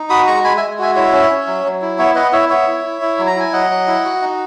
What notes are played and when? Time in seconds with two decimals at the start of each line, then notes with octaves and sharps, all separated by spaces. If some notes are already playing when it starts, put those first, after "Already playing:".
Already playing: D#4
0.10 F#4 B5 D#6
0.27 G#3 A#5 C#6
0.44 G#3 G#5 B5
0.57 E5 G#5
0.62 G#3
0.79 F#4 E5 G#5
0.95 E4 C#5 E5
1.13 C#4
1.30 C#4
1.47 F#3
1.64 F#3
1.82 E4
1.99 B3 C#5 E5
2.15 B3 B4 D#5
2.32 E4 C#5 E5
2.50 B3 C#5 E5
2.67 E4
2.84 E4
3.01 E4
3.18 F#3
3.27 A#5
3.36 E4 G#5
3.53 F#3 D#5 F#5
3.70 F#3
3.87 E4
4.05 F#4
4.22 D#4